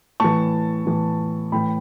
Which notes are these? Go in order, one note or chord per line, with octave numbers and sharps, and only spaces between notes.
A2 E3 A5 C#6
A2 E3
A2 E3 G5 B5